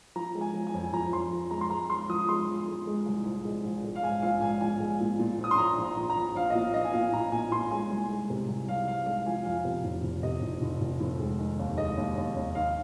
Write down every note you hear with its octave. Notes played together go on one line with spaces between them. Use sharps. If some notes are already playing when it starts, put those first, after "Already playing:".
F3 A#5
G#3
G#5
F3
G#5
F2
F2 A#5
F2 C6
F3
G#3 A#5
C6
G#3 A#5
G#3 C6
F3 D#6
G#3 C6
F3
G#3
G#3
C2
A#1
G#3
A#1
G#3
F5
G#2 G#5
A#1 F5
G#2 G#5
A#1 G#5
G#3
A#2
A#2
A#1 D#6
C6
A#1 A#5
A#1
A#5
A#1
A#5
A#1
A#1 F5
D#5
A#2 F5
A#1 D#5
G#5
A#2 F5
A#2 A#5
A#2 G#5
A#2 C6
G#3 G#5
C2
G#3
C3
C2
C2 F5
C2 F5
G#3 F5
F3 G#5
F2 F5
C3
F1
F1
C3 D#5
F1
F1
F1
F1
G#3
D#3
D#2
G#3 D#5
D#2
D#2
D#2
D#3 F5